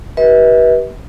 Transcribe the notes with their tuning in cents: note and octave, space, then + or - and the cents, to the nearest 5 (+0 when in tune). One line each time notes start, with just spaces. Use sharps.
G4 -35 B4 -30 E5 -45